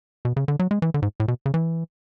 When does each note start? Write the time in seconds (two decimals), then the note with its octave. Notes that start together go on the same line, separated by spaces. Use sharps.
0.25 B2
0.36 C#3
0.48 D3
0.59 F#3
0.71 G#3
0.82 E3
0.94 D3
1.02 G#2
1.20 A2
1.28 B2
1.46 C#3
1.54 E3